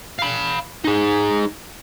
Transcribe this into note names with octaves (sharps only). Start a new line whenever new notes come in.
F5 B5
D#4 G#4